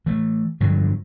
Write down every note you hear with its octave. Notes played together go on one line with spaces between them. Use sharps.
E3 A3
G2 D3 F3 F#3